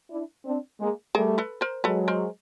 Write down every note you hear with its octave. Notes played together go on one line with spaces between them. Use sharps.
D4 E4
C4 D4
G#3 A#3
G3 A3 G#4 A#4
A4 B4
A#4 C5
F#3 G#3 A4 B4
A#4 C5